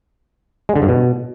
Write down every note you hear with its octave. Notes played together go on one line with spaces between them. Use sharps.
G#3
D3
G2
B2